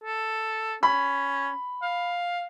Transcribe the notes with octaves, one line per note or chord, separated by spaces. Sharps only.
A4
C#4 B5
F5